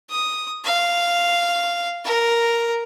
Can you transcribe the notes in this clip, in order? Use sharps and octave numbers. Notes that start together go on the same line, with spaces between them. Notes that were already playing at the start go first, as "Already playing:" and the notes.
D#6
F5
A#4